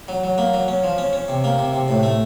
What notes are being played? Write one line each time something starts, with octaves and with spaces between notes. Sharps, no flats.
F#3
F#3
A#3
F#3
C#4
F3
C#4
C#4
C3
A#3
C3
C3
A2
A3